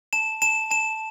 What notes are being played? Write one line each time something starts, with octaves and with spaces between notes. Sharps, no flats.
A5 E7
A5 E7
A5 E7